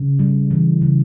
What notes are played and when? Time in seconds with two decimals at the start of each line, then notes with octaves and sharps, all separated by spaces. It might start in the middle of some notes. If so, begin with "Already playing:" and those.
Already playing: C#3
0.19 G3
0.51 E3
0.82 C#3